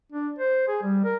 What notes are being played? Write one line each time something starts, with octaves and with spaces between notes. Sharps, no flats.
D4
C5
G#4
G3
A#4